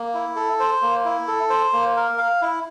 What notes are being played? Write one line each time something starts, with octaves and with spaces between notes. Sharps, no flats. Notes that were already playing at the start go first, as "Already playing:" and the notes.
Already playing: A#3
E4
A4
C5
A#3
E4
A4
C5
A#3
A#4
F5
E4